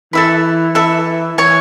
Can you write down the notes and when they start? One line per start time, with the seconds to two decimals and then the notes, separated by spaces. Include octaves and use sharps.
0.13 E3 A4 E5 B5
0.75 E3 A4 E5 B5
1.37 E3 C#5 G#5 C#6